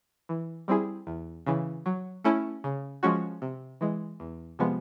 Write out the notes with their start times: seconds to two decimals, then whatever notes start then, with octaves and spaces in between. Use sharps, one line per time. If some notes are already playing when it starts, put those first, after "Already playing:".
0.29 E3
0.68 G3 C4 E4 G#4
1.07 E2
1.46 C#3 E3
1.86 F#3
2.24 A3 C#4 E4
2.64 C#3
3.03 F3 G#3 C#4 F#4
3.42 C3
3.81 E3 G#3
4.20 E2
4.59 C3 F3 G#3 B3